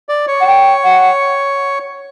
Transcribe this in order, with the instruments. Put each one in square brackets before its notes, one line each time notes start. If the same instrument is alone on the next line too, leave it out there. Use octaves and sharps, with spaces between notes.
[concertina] D5
C#5
[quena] F#5
G5
F#5